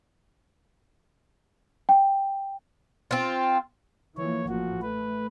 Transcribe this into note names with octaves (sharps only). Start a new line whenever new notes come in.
G5
C4 F4
E3 F3 A#3 C#5
A1 F3 F#4
A3 B4